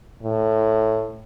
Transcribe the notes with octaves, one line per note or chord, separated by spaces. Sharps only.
A2